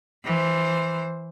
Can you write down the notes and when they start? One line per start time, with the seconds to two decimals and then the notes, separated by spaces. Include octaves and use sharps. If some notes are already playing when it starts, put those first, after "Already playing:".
0.25 E3 C5